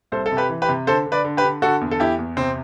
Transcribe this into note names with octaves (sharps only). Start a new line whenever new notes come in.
C2 A4 C5
A4
C3
G4 B4
E3
G4 B4
C3
D3 A4 C5
D3
B4 D5
D3
G4 B4
D3
D3 F#4 A4
E2
A4
E2 E4 G4
E2
C3 C4